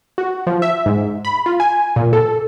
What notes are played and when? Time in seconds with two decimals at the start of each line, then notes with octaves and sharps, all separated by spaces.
0.18 F#4
0.47 F3
0.62 E5
0.86 G#2
1.25 B5
1.46 F4
1.60 G#5
1.96 A#2
2.13 A4